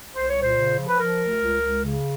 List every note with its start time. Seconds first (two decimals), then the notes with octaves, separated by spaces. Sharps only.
0.14 C2 C5
0.28 C#5
0.35 A#2
0.41 C5
0.57 C#3
0.78 F3
0.88 B4
0.98 F3 A#4
1.20 D2
1.41 C#2
1.62 C#2
1.83 C#3